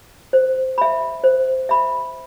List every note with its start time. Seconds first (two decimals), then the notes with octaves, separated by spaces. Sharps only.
0.33 C5
0.78 E5 B5
1.24 C5
1.69 E5 B5